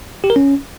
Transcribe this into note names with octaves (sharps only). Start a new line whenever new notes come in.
G4
A#4
C#4